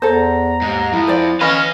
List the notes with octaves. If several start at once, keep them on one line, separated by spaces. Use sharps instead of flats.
E2 A4 C5 A#5
D#2 G#2
F2 E4
C5 D5
E3 C#4 B4 D#5 F5